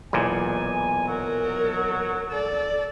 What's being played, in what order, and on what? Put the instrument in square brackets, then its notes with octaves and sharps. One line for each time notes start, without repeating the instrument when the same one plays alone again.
[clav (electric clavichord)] B1 E2 A#2 [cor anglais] G#5
[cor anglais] F#3 [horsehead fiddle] A#4
[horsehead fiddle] A4 D5